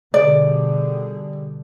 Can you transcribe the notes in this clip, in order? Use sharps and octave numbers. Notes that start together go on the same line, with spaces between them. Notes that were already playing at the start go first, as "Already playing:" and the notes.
B2 D3 G3 G#4 D5